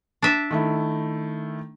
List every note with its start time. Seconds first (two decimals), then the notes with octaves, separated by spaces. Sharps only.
0.22 D4 E5
0.51 D#3 A3 E4